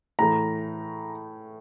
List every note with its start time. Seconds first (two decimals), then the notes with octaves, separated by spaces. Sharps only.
0.19 A2 E3 A3 A#5